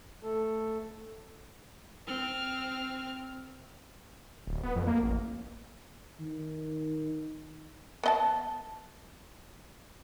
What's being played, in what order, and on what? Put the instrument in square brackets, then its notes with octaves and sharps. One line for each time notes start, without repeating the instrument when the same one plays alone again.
[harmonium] A3 A4
[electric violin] C4 F6
[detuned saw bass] D1
B3
F2
A#3
A1
[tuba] D#3
[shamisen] B3 D#5 A5